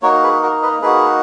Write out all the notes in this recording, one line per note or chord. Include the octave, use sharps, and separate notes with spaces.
A#3 D#4 F#4 A#4 C#5
G#4 B4
F#4 A#4
B4 D#5
A#3 D#4 F#4 G#4 B4